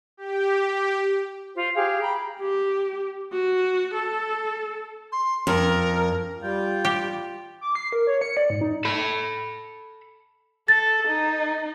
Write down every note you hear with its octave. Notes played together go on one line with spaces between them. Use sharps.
G4
F4 C5
G4 G#4 F5
G5 A#5 B5
G4
F#4
A4
C6
F2 A#4
G3 F4 G5
G4
D6
C7
A#4
C#5
C#7
D5
G#2
D#4
A4 B5
A4 A6
D#4